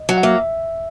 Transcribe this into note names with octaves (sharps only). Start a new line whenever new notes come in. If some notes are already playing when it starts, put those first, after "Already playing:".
Already playing: D#5
F#3
F#5
A#3 E5